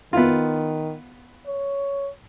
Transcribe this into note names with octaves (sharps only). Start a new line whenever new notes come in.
D#3 B3 E4 F4
C#5